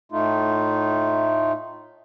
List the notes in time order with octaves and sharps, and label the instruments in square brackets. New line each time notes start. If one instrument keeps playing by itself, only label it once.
[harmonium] A2 A3 D#4 F4